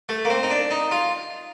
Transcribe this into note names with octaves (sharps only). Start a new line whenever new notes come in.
A3
A#3
C4
D#4
D4
D#4
F4